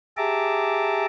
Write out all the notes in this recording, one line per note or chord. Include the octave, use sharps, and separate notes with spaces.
G4 G#4 E5 A5 A#5 D6